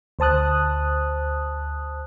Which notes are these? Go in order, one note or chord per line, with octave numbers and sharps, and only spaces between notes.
D2 C5 A5 D#6 F#6